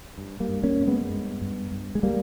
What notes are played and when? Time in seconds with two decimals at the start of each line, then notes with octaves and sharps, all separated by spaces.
0.18 G2
0.40 G3 A#3
0.48 G2
0.63 A#3 C#4
0.79 G2
0.87 G#3 B3
1.10 G2
1.41 G2
1.72 G2
1.95 G#3
2.03 G3 A#3